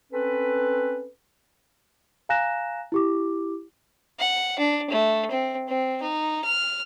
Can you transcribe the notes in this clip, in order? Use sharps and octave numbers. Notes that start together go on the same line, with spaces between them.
C4 C#4 A4 B4
F5 G#5 A#5 F#6 A#6 E7
E4 G4 D6
F#5
D4
A3
C4
C4
D#4
F6